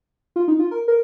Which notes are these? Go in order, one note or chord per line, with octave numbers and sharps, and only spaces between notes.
F4
D#4
F4
A#4
A#4